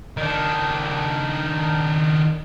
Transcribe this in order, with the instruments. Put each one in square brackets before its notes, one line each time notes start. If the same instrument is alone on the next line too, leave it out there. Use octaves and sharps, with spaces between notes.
[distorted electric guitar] D#3 D4